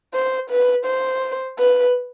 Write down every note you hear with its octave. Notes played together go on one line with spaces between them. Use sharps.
C5
B4
C5
B4